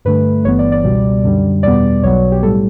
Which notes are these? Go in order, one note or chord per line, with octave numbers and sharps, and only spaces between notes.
G2 D3 A3 B4
G1 G2 E3 B3 C#5
D5
D5
C#2 B2 G3
F#2 D3 G3
E2 B2 G3 B3 D5
B1 B2 F#3 B3 C#5
G4
A2 G3 A4